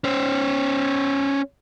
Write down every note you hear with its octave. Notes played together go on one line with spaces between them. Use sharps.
C#4 C5